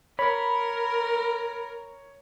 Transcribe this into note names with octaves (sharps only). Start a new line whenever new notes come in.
A#4 C#5 B5